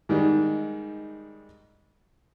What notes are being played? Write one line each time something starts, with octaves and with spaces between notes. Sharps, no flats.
G#2 D#3 G3